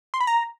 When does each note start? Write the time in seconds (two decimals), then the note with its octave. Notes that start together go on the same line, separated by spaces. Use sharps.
0.14 C6
0.21 B5
0.27 A#5